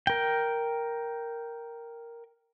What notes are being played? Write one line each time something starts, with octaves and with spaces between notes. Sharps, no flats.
A#4 G5